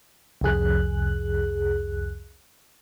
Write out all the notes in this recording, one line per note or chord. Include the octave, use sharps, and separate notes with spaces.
C2 F2 G#4 F#6